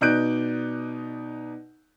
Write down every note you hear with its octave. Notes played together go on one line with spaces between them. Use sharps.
B2 D#4 D5 F#6 G6 D7